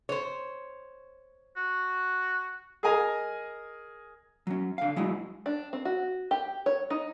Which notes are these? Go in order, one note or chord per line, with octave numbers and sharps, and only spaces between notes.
C5 C#5
F#4
G#4 A#4 D#5 G#5 A#5
F#3 C#4
D3 F5
F#3 G#3 E4
D4
C4
F#4
G4
C#5
D#4